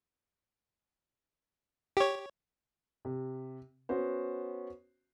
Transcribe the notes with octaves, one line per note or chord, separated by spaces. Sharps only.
G4 C#5
C3
B3 C#4 F#4 C5